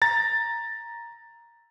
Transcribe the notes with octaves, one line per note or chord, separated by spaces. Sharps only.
A#5 A6